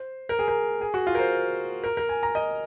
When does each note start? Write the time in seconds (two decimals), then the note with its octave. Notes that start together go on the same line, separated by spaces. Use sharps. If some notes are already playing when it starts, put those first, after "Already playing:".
Already playing: C5
0.29 A#4
0.39 G#4
0.48 A#4
0.81 G#4
0.94 F#4
1.07 F4
1.15 A#4
1.19 C5
1.84 A#4
1.97 A#4
2.09 G#5
2.23 A#5
2.35 D#5